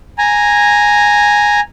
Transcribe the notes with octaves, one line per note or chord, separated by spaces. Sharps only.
G#5 A#5